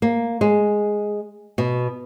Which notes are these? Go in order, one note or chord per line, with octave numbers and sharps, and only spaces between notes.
A#3
G#3
B2